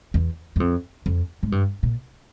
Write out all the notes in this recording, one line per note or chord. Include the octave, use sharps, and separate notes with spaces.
E2
F#2
F2
F2
G#2
G2
A#2